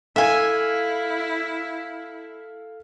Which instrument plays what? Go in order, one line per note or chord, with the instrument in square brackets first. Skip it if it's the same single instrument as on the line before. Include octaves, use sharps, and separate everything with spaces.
[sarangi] E4 [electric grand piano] A4 F5 [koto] E5 G#5